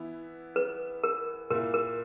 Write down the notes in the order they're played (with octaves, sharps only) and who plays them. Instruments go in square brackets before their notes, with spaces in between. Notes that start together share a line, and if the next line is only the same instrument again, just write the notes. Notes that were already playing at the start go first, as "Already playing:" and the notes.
Already playing: [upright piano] E3 B3 E4
[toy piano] B4
A#4
[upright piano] A#2 A#3 E4 [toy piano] A#4
[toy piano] A#4